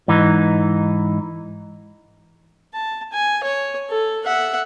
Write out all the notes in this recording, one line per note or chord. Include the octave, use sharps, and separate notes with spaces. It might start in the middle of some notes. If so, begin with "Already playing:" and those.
G#2 E3 D#4
A5
G#5
C#5
A4
E5 F#5